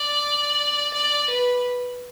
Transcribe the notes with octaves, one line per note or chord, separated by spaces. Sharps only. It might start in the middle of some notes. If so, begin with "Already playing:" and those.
Already playing: D5
D5
B4